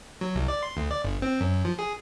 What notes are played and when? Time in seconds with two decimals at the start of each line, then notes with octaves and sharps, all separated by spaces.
0.21 F#3
0.35 C2
0.48 D5
0.63 C6
0.77 D2
0.91 D5
1.04 G1
1.22 C4
1.41 F#2
1.65 F3
1.79 G#4